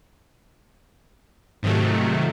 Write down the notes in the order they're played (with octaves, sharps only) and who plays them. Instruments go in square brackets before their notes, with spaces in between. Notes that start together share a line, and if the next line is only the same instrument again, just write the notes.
[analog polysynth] G#2 C3 D#3 F3 F#3 A3